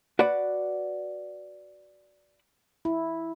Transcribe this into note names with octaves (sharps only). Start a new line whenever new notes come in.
F#4 B4 D5 F#5
E4